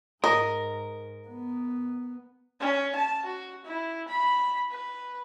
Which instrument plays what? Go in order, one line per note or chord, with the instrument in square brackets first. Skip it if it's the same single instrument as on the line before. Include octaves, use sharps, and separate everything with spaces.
[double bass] G#2 [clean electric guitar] A#4 [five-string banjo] D#5
[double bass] B3
[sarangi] C#4
A5
F#4
E4
B5
B4